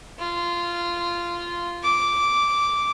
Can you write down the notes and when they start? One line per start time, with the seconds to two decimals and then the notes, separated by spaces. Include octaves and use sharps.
0.19 F4
1.83 D6